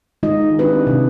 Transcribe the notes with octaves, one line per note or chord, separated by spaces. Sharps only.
D#3 G#3 D#4 F4 D#5
C4 D4 E4 F4 G4 B4
C3 D#3